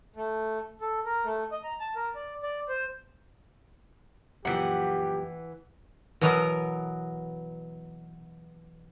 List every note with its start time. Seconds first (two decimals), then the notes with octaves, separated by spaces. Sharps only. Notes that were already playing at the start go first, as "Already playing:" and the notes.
0.16 A3
0.81 A4
1.05 A#4
1.24 A3
1.52 D#5
1.64 A#5
1.80 A5
1.96 A#4
2.15 D5
2.43 D5
2.69 C5
4.45 F#2 A#2 E3 F3 G4 F#5
6.21 B2 E3 F#3 B3 A#4 A#5